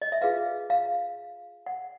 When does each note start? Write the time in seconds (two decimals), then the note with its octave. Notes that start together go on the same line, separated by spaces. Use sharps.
0.02 D#5
0.12 E5
0.22 F4 G#4 B4 F5
0.70 F5
1.66 F#5